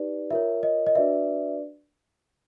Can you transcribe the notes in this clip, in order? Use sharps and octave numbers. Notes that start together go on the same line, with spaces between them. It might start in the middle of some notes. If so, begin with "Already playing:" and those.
Already playing: D#4 G4 B4 D5
F4 A#4 C#5 E5
D#5
D#5
D4 F#4 B4 D5 E5